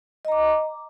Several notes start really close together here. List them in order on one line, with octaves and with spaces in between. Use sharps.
D#5 A#5 D6